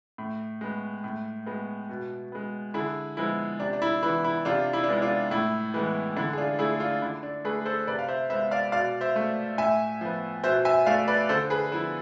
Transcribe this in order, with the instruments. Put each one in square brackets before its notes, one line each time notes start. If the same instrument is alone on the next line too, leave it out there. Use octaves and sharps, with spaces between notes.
[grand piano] A2
G#3 B3
A2
G#3 B3
B2
G#3 B3
D3 E4 G#4
F3 G#3 B3 E4
C3 D4
D4
E4
E3 E4
B3
E4
C3 D4 F4
E4
D4
G#3 B3 E4
D4 F4
A2 E4
E3 G#3 B3
D3 E4
G#4
D4 F4
A3 E4 G#4
D4 F4
D3 E4
D4
A3 G#4 B4
A4 C5
C3 B4 D5
F5
C5 E5
G#3 B3 C5 E5
D5 F5
B2 D5 F5
C5 E5
A3
A2 E5 G#5
F3 B3
B2 C5 E5
E5 G#5
A3 D5 F5
B4 D5
D3 A4 C5
G#4 B4
F3 B3 E4